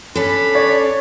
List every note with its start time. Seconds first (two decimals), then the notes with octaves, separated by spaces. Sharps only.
0.15 C#4 D4 A4 B5
0.55 C#5 D5